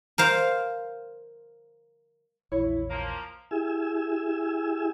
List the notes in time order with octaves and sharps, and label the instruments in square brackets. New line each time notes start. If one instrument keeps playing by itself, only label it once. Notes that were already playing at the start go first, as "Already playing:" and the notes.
[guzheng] A#4 C5 F5
[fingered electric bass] A#1 E2 [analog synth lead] E4 [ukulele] C#5
[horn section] F3 A#3 [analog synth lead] A#5
[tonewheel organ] E4 G4 G#4 G#5 E6